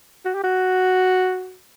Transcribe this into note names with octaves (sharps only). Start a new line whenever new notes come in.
F#4
G4
F#4